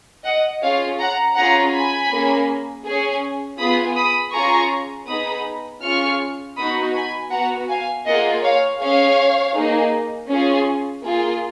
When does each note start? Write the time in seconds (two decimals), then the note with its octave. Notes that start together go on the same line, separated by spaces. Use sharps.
0.25 D#5 F#5
0.62 C#4 F4 G#4 C#5 F5
0.99 F#5 A#5
1.36 C#4 F4 G#4 F#5 A#5
1.73 G#5 B5
2.11 A#3 C#4 G#4
2.86 C#4 G#4
3.59 B3 F4 G#4 B5 D#6
3.97 B5 D#6
4.34 C#4 F4 G#4 A#5 C#6
5.08 B3 D#4 G#4 B5 D#6
5.83 C#4 F4 G#4 C#6 F6
6.57 B3 D#4 F#4 B5 D#6
6.94 G#5 B5
7.31 B3 F#4 F#5 A#5
7.69 F5 G#5
8.06 A#3 F4 G#4 D#5 F#5
8.43 C#5 F5
8.80 C#4 G#4 C#5 F5
9.54 A#3 D#4 G#4
10.29 C#4 F4 G#4
11.03 A#3 F4 G#4